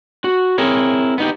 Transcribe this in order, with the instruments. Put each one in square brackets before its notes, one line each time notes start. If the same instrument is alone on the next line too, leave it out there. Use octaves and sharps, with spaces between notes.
[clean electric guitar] F#4
C4 E4 G#4 A#4 C#5
B3 D#4 G4